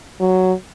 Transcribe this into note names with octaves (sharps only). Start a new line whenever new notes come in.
F#3